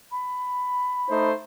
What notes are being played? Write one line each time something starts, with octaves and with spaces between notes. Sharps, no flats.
B5
A3 D#4 C5